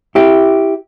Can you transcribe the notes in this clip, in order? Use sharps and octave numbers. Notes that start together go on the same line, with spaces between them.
E4 G4